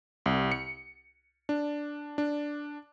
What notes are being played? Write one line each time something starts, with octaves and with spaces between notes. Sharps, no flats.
C2
C#7
D4
D4